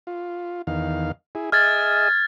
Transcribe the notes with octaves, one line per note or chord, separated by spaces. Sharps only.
F4
E2 D#3 F5
E4 G#4
G#4 D#5 E5 F6 G#6 A6